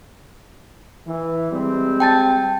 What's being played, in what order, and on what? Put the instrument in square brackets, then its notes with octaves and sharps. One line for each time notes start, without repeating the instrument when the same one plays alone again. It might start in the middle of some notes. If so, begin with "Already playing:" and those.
[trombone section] E3
G3 G#3 C4
[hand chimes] G5 A5 A6